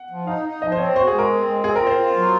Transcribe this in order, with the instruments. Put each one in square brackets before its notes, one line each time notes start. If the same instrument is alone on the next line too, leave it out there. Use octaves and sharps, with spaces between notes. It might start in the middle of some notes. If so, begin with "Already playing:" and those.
Already playing: [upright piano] F#5
[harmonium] F3
[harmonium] D#4 [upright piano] F5
[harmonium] D#4
[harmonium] F3 [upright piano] D#5
[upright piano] C5
[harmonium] C4 [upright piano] C#5
[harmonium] F#4 [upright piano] C5
[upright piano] G#4
[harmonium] G#3
[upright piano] A#4
[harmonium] C4
G#3
[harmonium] C4 [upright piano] G#4
[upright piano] A#4
[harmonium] F4
[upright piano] C5
[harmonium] F4
F#3